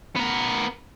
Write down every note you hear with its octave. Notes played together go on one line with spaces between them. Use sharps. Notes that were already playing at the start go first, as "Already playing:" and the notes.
B3 A#4